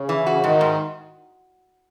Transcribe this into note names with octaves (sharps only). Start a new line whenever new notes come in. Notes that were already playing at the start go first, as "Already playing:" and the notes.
Already playing: C#3
E3
F#4
G#2 D#3
G#2